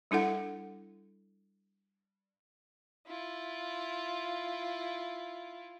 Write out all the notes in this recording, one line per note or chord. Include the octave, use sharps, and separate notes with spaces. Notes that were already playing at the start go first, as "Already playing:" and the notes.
G3 D4 E4 A4 F#5
E4 F4